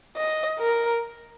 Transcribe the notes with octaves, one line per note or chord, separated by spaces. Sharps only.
D#5
A#4